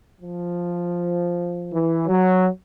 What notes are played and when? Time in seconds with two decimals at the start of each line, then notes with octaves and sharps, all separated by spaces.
0.21 F3
1.71 E3
2.07 F#3